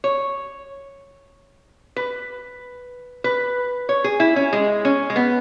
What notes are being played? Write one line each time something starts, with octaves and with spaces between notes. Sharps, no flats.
C#5
B4
B4
C#5
G#4
E4
C#4
G#3
C#4
G#3
B3